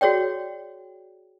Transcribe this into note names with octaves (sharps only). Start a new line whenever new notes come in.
F#4 G#4 C#5 D5 G5